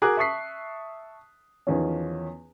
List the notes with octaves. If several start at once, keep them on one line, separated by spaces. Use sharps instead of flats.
F#4 G#4 A#4 D6 F#6
E5 A5 C#6 D#6 B6 C7
E2 D#3 F3 C#4